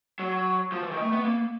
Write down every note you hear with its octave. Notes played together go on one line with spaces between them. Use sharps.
F#3
F3
E3
D#3
A3
B3
A#3